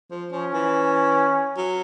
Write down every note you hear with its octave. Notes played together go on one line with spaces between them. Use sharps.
F3
F3 C#4
E3
F#3